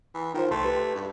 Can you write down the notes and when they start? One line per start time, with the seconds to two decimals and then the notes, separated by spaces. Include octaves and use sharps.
0.15 E3
0.34 D#3 D#4 F4 C5
0.51 C2 A3 C6
0.64 G4 B4
0.96 G2